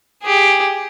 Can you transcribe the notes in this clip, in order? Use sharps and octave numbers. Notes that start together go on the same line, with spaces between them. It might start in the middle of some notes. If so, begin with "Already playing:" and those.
G4 G#4